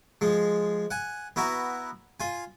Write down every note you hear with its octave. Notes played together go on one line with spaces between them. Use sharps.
F3 G#3
F#5 G#5
B3 E4 F#4 A#5
F4 G#5